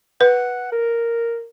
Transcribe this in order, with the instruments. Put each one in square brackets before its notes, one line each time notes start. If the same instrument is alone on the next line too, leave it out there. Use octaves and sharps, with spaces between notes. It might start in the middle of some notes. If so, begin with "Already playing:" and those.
[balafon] B4 [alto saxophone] F#5
[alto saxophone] A#4